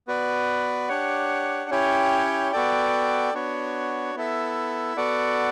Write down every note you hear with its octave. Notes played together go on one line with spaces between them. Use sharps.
B3 F#4 B4 D5
D4 G4 C#5 F#5
C#4 E4 G4 C#5 G5
B3 F#4 A4 D5 G5
B3 D4 F#4 C#5
B3 E4 A4 E5
B3 F#4 A4 D5 F#5